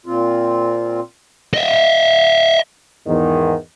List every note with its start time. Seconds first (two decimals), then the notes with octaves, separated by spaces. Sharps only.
0.06 A#2 C4 F4
1.54 D#5 E5
3.08 E2 G#2 D#3